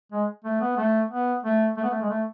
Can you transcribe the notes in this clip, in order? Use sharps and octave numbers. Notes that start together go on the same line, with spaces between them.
G#3
A3
B3
A3
B3
A3
A3
B3
A3
G#3
A3